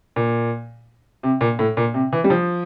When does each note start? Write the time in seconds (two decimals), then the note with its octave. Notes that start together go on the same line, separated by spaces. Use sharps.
0.16 A#2
1.23 C3
1.41 A#2
1.59 A2
1.77 A#2
1.94 C3
2.13 E3
2.24 G3
2.30 F3